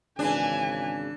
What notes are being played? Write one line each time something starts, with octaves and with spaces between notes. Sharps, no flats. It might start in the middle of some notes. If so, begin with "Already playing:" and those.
G#1 C#3 E3 D4 G#5